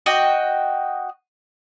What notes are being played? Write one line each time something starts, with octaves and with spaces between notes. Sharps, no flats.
F#4 D#5 G5